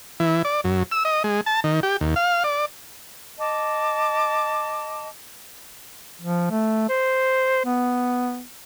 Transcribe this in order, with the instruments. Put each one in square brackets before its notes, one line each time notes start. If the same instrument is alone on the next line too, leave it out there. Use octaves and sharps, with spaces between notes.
[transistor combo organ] E3
D5
F#2
E6
D#5
G#3
A5
D#3
G4
D#2
F5
D5
[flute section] D#5 A5 D6
[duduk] F3
A3
C5
B3